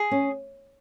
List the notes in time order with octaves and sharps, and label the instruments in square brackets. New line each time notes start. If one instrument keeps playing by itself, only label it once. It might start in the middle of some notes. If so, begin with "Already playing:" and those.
Already playing: [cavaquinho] G#4
[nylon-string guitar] C#4